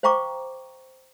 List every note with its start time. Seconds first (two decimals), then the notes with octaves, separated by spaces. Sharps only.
0.03 C5 F5 G5 A#5 C#6 D6